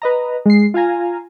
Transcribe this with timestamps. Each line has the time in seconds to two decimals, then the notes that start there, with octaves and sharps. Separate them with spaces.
0.02 B4 D#5 A#5
0.46 G#3 C7
0.74 F4 F5 G#5 A#5